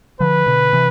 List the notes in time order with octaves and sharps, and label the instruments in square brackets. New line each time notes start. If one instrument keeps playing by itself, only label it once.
[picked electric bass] D3 F3 [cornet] B4
[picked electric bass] B2 D3
C3 E3